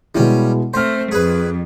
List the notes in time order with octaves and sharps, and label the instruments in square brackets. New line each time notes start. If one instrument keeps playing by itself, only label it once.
[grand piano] B2 G#3 E4 [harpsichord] G3 C#4
[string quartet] A3 C4 [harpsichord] C5 [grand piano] C6 F6
[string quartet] F2 [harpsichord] G#4 B4